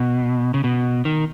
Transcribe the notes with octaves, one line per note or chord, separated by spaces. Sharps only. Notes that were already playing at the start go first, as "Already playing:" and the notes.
Already playing: B2
C#3
B2
D#3